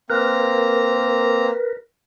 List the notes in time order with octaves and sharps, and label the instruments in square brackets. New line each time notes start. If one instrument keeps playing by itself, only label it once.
[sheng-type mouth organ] A#3 C4 A#5 [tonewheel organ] A#4 B4